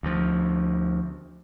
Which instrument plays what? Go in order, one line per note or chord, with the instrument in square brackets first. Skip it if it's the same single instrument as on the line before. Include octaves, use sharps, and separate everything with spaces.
[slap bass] D2 F3